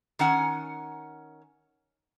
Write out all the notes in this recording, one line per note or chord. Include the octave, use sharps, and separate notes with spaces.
D#3 C#4 F#5 G#5